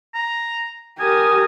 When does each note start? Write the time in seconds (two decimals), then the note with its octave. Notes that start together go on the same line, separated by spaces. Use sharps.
0.15 A#5
0.99 G4 A#4 G#5 D#6